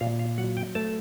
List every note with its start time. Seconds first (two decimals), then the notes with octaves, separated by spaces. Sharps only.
0.01 A#2 F5
0.19 F5
0.38 F#3 F#5
0.57 G5
0.75 A3 A5